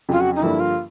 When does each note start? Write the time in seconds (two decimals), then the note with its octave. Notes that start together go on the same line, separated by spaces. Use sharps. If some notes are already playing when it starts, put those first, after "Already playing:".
0.09 F2 C#3 F#3 F4
0.20 F#4
0.36 D#4
0.42 G2 D3 F3 A#3 E4
0.60 F4